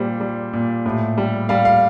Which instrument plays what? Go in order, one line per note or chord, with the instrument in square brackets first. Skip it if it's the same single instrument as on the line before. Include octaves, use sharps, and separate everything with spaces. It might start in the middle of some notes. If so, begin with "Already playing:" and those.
Already playing: [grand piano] A#2 G3 C5
G3
A#2
A2
G3
G3 F5
F5